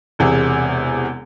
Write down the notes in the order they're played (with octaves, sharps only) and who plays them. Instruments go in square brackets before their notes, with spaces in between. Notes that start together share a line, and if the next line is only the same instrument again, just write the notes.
[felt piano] E1 E2 C3 G#4